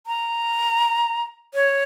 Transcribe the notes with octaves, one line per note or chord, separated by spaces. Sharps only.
A#5
C#5